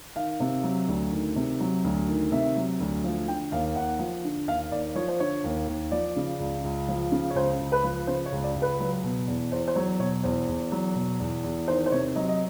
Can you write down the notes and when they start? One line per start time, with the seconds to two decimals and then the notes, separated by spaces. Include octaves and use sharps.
0.16 D#3 F5
0.40 C3
0.63 F#3
0.88 D2
1.12 D#3
1.36 C3
1.60 F#3
1.84 D2
2.08 D#3
2.32 C3 E5
2.56 F#3
2.80 D2
3.04 F3
3.28 D3 G5
3.52 D#2 F5
3.76 D#2 F#5
3.99 F3
4.24 D3
4.48 D#2 F5
4.71 D#2 D5
4.95 F3 C#5
5.08 C5
5.20 D3 C#5
5.44 D#2
5.67 D#2
5.92 F3 D5
6.16 C#3
6.40 C#2
6.64 C#2
6.88 F3
7.12 C#3
7.30 C#5
7.35 C#2 C5
7.60 C#2
7.72 B4
7.84 F3
8.07 C#3 C5
8.26 C#5
8.32 C#2
8.44 D5
8.56 C#2
8.62 B4
8.80 F#3
9.03 B2
9.27 E2
9.52 E2 C5
9.68 C5
9.76 F#3 C#5
9.99 B2 C#5
10.23 E2 C5
10.48 E2
10.72 F#3
10.96 B2
11.20 E2
11.44 E2
11.68 D#3 C5
11.86 C5
11.92 C3 C#5
12.15 F#3 D#5
12.28 D#5